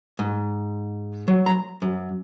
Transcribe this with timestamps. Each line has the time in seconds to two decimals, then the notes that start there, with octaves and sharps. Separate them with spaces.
0.19 G#2
1.28 F#3
1.46 A#5
1.82 F#2